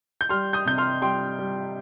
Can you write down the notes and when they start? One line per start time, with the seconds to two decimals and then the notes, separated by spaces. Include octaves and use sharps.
0.21 G6
0.29 G3 C6 F6
0.53 D#6 G6
0.65 C3 G6
0.78 C6 F6
1.02 G3 G5 C6
1.39 G3